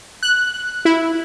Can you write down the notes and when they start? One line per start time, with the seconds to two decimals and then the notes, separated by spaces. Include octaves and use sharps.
0.23 F#6
0.85 E4